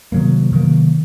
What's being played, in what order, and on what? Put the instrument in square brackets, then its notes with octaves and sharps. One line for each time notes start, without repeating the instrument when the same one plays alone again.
[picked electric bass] C3 D#3 F#3 A#3
C3 D#3 F#3 A#3